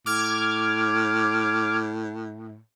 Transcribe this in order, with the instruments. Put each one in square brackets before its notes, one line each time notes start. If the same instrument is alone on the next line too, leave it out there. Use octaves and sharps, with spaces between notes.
[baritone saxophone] A2 [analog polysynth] D6 F6 G#6